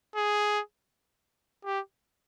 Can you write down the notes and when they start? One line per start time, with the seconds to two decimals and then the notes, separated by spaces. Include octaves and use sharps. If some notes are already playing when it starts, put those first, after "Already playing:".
0.15 G#4
1.65 G4